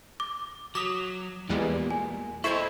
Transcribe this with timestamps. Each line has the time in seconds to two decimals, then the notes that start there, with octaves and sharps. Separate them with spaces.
0.20 D6
0.75 F#3 D6 D#6 B6 E7
1.50 E2 A#2 G3 G#3
1.91 G#5
2.44 E4 A4 C5 D#5 C#6 G#6 E7